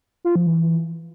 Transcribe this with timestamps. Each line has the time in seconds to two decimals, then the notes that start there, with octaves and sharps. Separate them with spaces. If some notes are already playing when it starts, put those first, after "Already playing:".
0.24 F4
0.36 F3
0.47 E3